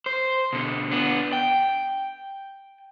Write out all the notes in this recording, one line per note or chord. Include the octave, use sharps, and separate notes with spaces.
C5
B2 D3
B3 D4
G5